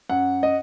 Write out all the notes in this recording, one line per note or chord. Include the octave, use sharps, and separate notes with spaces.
F#2 F#5
D#5